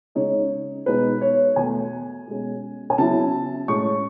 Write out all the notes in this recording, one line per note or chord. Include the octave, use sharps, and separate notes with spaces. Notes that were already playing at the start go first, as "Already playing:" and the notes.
C#3 G#3 D#4 C#5
B2 G#3 D#4 B4
C#5
E2 B2 A3 G#5
B2 G#3 C#4
G#5
C#3 F#3 B3 E4 A5
A2 G#3 C#4 C#6